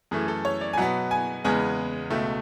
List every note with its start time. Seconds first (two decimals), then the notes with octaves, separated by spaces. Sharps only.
0.11 F#2 E3 A3 G#4
0.28 A4
0.45 C#5
0.61 D5
0.73 G#5
0.77 B2 F#3 B3 F#5
1.11 G#5
1.44 E2 C#3 G#3 B3 G#5
2.10 C#2 B2 A3 E5